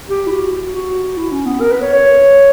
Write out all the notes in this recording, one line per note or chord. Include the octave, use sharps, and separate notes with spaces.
G4
E4
F#4
F#4
E4
C#4
B3
A#4
B4
C#5
C#5